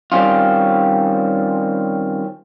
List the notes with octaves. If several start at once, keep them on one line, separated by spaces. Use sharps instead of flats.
D#3 G3 C4 C#4 F4